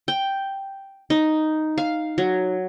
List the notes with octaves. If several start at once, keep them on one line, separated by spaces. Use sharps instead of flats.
G5
D#4
F5
F#3